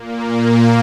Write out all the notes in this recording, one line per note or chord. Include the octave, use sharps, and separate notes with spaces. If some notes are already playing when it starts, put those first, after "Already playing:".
Already playing: A#2 A#3